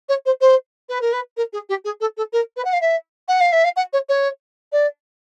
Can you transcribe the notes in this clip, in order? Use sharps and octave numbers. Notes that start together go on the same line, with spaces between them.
C#5
C5
C5
B4
A#4
B4
A#4
G#4
G4
G#4
A4
A4
A#4
B4
F#5
F5
E5
F#5
F5
E5
F5
F#5
C#5
C#5
D5